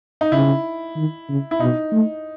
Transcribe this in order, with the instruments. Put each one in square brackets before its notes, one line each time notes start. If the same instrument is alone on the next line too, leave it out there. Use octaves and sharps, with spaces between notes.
[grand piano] D#4
[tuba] C#3 [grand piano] E4
[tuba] D#3
C#3
[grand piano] E4
[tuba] B2 [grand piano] D#4
[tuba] A3